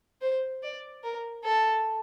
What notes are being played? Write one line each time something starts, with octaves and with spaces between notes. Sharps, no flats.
C5
D5
A#4
A4